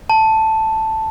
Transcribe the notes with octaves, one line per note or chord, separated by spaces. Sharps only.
A5